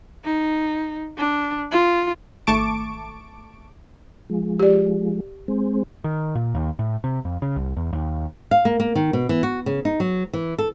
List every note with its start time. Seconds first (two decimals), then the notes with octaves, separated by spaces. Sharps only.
0.24 D#4
1.17 D4
1.71 F4
2.47 G#1 A3 A5 C#6 D6 D7
4.30 F3 G#3
4.59 G4 D5
5.48 G#3 C4
6.04 D#3
6.35 A#2
6.55 D#2
6.79 A2
7.04 C3
7.25 F2
7.42 C#3
7.56 C2
7.76 E2
7.93 D#2
8.51 F5
8.65 A#3
8.80 A#3
8.95 D#3
9.13 B2
9.29 E3
9.43 F#4
9.66 C#3
9.85 D#4
10.00 F#3
10.33 E3
10.58 A4